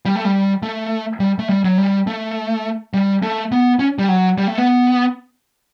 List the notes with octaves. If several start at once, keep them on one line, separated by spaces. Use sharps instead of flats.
G3
A3
G3
A3
G3
A3
G3
F#3
G3
A3
G3
A3
B3
C#4
G3
F#3
G3
A3
B3